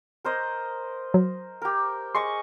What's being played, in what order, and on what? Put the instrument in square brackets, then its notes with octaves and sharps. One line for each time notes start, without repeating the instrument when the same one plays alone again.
[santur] A#4 C5 D#5
[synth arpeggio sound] F#3
[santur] G4 A#4
[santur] G#4 D#5 C#6 [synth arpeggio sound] C6